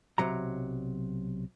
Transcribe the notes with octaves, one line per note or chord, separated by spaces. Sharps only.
B1 C3 F#3 A#5